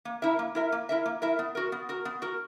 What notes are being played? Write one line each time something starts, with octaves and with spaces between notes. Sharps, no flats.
A#3
E4 A#4 E5
A#3
E4 A#4 E5
A#3
E4 A#4 E5
A#3
E4 A#4 E5
B3
F#4 A#4
B3
F#4 A#4
B3
F#4 A#4